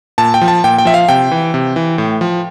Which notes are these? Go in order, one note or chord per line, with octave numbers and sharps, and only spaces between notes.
A#2 A5
G5
F3
A5
A#2 G5
G5
F3 E5
F5
C3 G5
E3
C3
E3
A2
F3